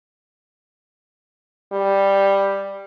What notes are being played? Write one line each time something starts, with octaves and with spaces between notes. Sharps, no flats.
G3